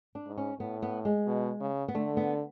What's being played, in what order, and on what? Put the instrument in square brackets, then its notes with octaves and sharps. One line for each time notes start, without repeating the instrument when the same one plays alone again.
[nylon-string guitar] D4
[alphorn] G#2
[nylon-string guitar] C#4
[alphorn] A2 [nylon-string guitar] B3
[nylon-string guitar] B3
G#3
[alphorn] B2
C#3
[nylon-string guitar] B3
[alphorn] D3 [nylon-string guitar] A3
[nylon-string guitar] B3